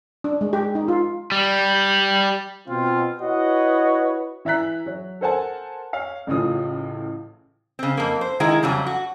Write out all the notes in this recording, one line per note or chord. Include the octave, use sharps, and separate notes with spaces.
D4
G#3
G4
D#4
F4
G3
B2 C4 F4
E4 F#4 B4 C#5 D#5 F#5
E3 E5 A#5 F#6 B6
F#3
A4 A#4 C5 F#5 G#5 A5
C#5 F5
A1 A2 C#3 F3 D#6
C#3 C4
F2 A#3
C5
D#3 G#3 E4
F2 C#3 F#3 G3
F#4